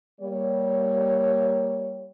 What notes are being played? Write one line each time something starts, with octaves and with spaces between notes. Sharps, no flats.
G3 A#3 C#5